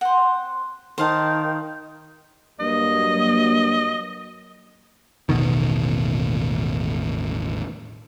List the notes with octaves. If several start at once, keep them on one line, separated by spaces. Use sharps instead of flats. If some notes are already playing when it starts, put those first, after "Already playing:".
C4 C5 F#5
D#3 C5 F5 F#5 A5 C6
G2 F#3 A#3 D#5
E1 A1 B2 D#3